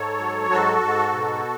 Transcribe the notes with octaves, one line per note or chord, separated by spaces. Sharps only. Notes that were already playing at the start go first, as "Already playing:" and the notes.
Already playing: G#2 A4 C#5
F#3
G#2 F#4 A4
G#2
B2